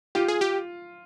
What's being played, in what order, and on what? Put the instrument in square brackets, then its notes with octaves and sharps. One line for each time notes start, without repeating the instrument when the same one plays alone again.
[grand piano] F4 [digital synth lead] G4
[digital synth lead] G#4
G4